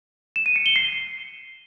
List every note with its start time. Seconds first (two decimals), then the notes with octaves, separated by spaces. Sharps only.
0.36 E7
0.46 D#7
0.56 C#7
0.66 G7
0.76 C7